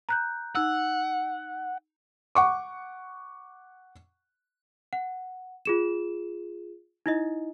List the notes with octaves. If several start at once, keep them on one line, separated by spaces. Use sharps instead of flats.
A#5 F#6 G6
D#4 F#5 E6
F#5 C#6 D6
F#5
F4 G#4 E7
D#4 E4 D#5